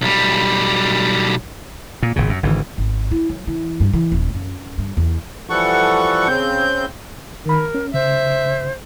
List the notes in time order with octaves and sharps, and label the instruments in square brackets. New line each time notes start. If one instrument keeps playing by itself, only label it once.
[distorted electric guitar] B1 G3
[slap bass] A#2
G#1 A#2 C#3
F#2
G#1 D3 E3
[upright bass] G#1
E4
F#3
E3
G2
E3
D#1
F#2
G2
E2
[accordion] E3 F3 G3 A4 F#5 C#6
C#3 C4 G6
[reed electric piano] D#3 B5 [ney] A#4
[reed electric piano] C#4
[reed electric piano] C#3 [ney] C5 [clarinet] E5